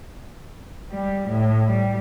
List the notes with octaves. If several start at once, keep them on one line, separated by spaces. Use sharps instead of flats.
G3
A2
G3